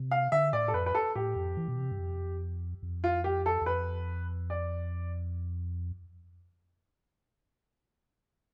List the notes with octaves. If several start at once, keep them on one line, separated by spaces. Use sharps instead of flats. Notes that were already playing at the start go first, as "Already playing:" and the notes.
Already playing: C3
F5
D3 E5
A2 D5
A4
F2 B4
B4
A4
A2 G4
F2
E3
B2
C3
G2
F2
F2
F4
G4
A4
E2
F2 B4
D5